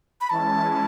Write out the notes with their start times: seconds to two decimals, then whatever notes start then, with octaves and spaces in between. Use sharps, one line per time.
0.21 B5
0.30 E3 G#3 C#4 E4 A5